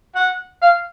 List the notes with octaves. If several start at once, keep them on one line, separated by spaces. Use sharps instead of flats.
F#5
F5